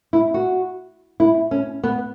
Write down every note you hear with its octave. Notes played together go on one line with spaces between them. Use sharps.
E4
F#4
E4
C#4
B3